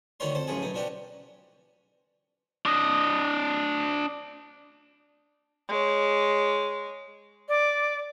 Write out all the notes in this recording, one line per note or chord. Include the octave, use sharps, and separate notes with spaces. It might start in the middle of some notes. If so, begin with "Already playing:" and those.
D2 D#3 G3 A#4 C#5 C6
F2 A4 C5
A1 F#2 A2 F3 G#4
F#2 B2 D#4
B2 F3 D4 F#4 G4
D4 D#5
G#3 C#5
D5